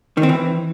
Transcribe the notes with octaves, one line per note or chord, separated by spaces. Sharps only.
D#3
C4
E3